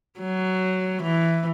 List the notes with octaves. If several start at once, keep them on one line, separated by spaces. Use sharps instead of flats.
F#3
E3